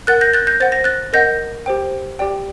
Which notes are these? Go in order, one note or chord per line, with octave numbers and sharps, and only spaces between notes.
A#4 F#5 F#6 A6
G6 A#6
F#6 A6
G6 A#6
C5 F#5 A6
A#6
F#6 A6
A#4 D#5 F#5 G6 A#6
G4 C5 G5
G4 D5 G5